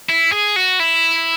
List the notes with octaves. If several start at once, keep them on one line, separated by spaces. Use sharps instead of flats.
E4
G#4
F#4
E4